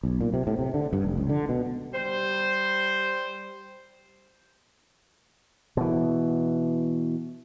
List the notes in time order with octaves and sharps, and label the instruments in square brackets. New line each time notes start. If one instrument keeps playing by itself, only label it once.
[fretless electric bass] B1
A#2
C3
A2
C3
D3
G2
F1
C#2
D3
B2
[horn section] G3 C5
[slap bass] B2 E3